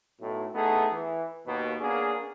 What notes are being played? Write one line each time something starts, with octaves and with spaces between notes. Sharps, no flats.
B1 A2
A3 B3 D#4 E4 G#4 A4
E3
D#2 B2
A#3 B3 C#4 D4 G#4